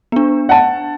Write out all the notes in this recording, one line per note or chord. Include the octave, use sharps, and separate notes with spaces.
B3 D4
F#5 A5